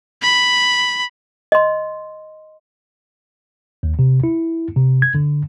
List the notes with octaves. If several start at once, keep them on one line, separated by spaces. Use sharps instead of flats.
B5
D#5 C6
D#2
C3
E4
C3
G#6
D3